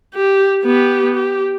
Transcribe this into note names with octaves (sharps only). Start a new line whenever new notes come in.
G4
B3 G4
G4